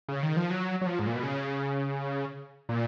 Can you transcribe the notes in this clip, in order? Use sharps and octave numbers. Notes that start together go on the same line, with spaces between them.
C#3
D#3
F3
F#3
F#3
F3
G#2
A#2
B2
C#3
A#2